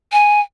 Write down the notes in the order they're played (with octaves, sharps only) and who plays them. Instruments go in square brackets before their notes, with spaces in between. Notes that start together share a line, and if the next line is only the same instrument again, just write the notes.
[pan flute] G#5